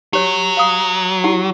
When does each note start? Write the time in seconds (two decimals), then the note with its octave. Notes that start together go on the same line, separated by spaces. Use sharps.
0.13 F#3 G4 C#5
0.57 F5 D#6
1.24 E4 G4 F#5